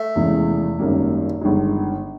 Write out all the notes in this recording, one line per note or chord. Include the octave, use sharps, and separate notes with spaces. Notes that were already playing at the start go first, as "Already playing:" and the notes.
Already playing: A3
F1 E2 C#3 E3 G#3
G#1 F#2 D#3 G3 A#3
G1 G2 D#3 G#3